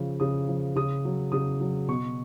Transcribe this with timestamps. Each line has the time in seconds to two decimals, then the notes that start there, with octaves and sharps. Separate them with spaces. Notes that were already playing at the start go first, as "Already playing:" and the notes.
Already playing: C#3 F3
0.20 C#3 D#6
0.49 F3
0.76 C#3 D#6
1.05 F#3
1.32 C#3 D#6
1.61 F#3
1.88 B2 C#6